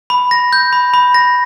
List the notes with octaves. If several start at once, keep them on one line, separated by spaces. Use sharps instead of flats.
B5
A#6
G6
B5
B5
A#6